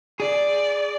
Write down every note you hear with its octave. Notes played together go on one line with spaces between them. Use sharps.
G#4 D5